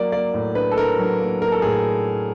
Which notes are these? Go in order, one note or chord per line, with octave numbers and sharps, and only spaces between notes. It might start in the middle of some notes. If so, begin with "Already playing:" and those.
Already playing: F#3 A#3 D5
A#3 D5
A2
D4 B4
A4
D4 A#4
F#3
A#3
A#3 A#4
A4
A2 G#4